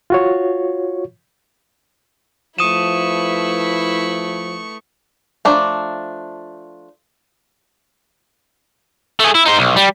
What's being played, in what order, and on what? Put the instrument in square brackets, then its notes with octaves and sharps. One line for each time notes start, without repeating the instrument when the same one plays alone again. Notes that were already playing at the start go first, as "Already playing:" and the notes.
[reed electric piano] F4 F#4 C#5
[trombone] F3 [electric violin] A3 C#6 [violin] E4 B4 [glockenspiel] D#6 D#7 E7
[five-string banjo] F3 A3 D4 A#5
[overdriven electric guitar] A3 G#4
E4
D#4 C5
B1
G3